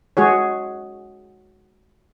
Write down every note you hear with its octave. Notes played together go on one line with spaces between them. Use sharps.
G#3 F#4 G#4 C#5